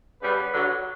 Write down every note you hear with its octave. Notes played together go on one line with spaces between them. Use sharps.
C#3 G3 B3 B4
G2 D3 F#3